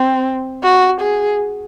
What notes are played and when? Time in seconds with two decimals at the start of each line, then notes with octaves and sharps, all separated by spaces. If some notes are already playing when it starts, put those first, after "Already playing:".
Already playing: C4
0.63 F#4
1.01 G#4